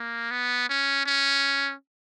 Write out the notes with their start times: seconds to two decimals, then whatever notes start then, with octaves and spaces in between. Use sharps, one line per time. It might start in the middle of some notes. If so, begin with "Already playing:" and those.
Already playing: A#3
0.31 B3
0.69 C#4
1.06 C#4